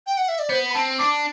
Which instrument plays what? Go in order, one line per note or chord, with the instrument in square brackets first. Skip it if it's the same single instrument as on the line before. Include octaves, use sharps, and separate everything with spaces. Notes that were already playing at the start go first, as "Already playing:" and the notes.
[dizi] G5
F#5
E5
D5
[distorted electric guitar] B3 [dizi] C5
[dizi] B5
[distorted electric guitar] C4 [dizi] A5
[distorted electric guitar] D4 [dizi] D6